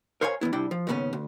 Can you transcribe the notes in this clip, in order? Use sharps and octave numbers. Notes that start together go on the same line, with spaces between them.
A#4 C5 C#5 F5 G5 G#5
E2 E3 B3 E4
C2 G3 D4 E4 G5
F3
D#2 G#2 C#3 B3 C#4
D2